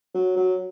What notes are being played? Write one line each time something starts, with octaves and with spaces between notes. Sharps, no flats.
F#3
F#3